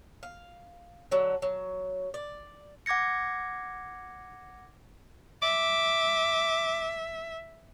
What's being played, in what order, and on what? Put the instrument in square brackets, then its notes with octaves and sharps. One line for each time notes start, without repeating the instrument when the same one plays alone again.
[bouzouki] F5
D3 F#3
F#3
D5
[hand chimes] F#5 D6 G#6 A#6 C#7
[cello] E5 [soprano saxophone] D6